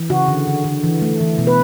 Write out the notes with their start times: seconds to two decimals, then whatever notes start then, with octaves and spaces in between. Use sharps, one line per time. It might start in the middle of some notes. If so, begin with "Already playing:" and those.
Already playing: E3
0.10 C#3 F#4
0.28 D3
0.47 D3
0.64 D3
0.84 E3
1.02 A3
1.20 E3
1.38 B2
1.47 B4